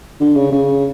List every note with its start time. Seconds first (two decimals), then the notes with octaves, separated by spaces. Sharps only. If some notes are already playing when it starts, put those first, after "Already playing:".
0.20 D3
0.36 C#3
0.52 C#3